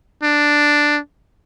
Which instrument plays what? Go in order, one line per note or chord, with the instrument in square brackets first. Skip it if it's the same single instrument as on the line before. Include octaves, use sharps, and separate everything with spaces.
[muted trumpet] D4